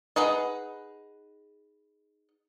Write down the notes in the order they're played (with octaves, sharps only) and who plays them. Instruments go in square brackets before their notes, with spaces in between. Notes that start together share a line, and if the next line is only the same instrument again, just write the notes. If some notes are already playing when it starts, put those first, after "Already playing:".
[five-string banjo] D#4 G#4 B4 F#5